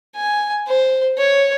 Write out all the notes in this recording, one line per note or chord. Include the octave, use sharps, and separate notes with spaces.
G#5
C5
C#5